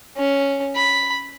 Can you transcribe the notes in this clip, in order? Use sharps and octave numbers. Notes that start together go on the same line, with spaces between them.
C#4
B5